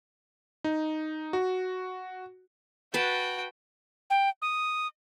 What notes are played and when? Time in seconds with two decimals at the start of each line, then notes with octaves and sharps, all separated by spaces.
0.64 D#4
1.33 F#4
2.94 F#4 B4 G5 A5
4.10 G5
4.42 D#6